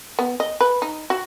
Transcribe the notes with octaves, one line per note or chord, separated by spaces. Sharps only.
B3
D#5
B4
D#4
F#4